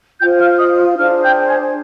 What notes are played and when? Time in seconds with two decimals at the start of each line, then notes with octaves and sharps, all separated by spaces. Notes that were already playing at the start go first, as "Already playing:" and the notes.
0.20 F4 C5 G5 G6
0.39 F5 F6
0.59 D#5 D#6
0.97 D4 G#4 C5 F5 F6
1.23 G5 G6
1.48 G#5 G#6